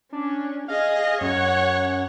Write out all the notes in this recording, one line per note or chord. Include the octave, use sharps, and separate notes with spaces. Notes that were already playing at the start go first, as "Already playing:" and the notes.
C#4 D4
G#4 D#5 F5
F#2 C#5 F#5